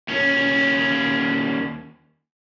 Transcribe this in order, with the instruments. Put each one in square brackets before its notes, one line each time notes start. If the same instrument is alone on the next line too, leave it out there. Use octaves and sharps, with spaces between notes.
[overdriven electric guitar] D#2 C#4